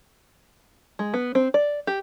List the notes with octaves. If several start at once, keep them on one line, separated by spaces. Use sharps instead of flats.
G#3
B3
C4
D5
G4